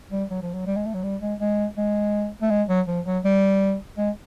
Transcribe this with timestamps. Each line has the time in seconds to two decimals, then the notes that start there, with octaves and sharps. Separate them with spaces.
0.11 G3
0.30 F#3
0.42 F3
0.54 F#3
0.67 G3
0.76 G#3
0.86 A3
0.94 F#3
1.03 G3
1.21 G#3
1.40 G#3
1.77 G#3
2.42 A3
2.50 G#3
2.68 F#3
2.87 F3
3.06 F#3
3.24 G3
3.97 G#3